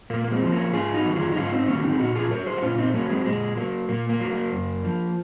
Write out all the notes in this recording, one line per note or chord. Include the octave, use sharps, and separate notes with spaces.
A#2 A#3
A#3
G#3 C4
F3
A#3 C#4
G#2 F4 G#4
D#4 F#4
D#3 F#3
F4 G#4
D#4
G#2 C#4 F4
C4 D#4
D#3 F#3 A#3 C#4
C4 D#4
G#4
A#2 D#4 F#4
F4 G#4
F#3 A#4 C#5
G#4 C5
F#4
A#2 C#4 F4
C4 D#4
F#3 A#3 C#4
G#3 C4
A#2 G#3
F#3 A#3
A#2 A#3
A#3
F#3
A#3
F#2
F3